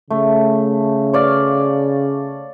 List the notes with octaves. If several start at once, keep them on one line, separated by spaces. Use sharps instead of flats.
C#3 A3
C#5 D5 F5